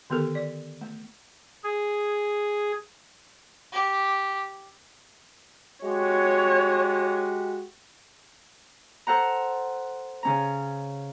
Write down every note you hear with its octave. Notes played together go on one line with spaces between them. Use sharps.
D3 D#3 B3 G4 A4 A#4
D5
A3
G#4
G4
G#3 F#4 G4 C#5
A4 C5 F#5 A#5
C#3 C#4 A#5